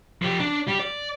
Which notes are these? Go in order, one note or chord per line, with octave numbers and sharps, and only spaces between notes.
F3 G4
D4
G3 G4
D5